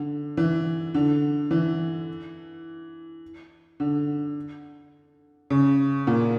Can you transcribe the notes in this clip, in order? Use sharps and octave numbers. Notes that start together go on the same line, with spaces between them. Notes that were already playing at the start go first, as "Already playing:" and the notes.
Already playing: D3
E3
D3
E3
D3
C#3
A#2